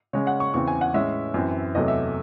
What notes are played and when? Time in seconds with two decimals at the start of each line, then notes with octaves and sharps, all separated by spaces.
0.13 C#3 G#3 C#4 C#5
0.27 F#5
0.40 C#6
0.54 E2 C#3 E3 C4 C#6
0.68 G#5
0.81 F#5
0.94 A2 G#3 C#4 E5
1.34 F#2 E3 C4
1.75 E2 C3 F#3 A3 D#5
1.88 E5